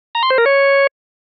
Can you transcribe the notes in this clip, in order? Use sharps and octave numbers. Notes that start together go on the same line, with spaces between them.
A#5
C6
C5
A#4
C#5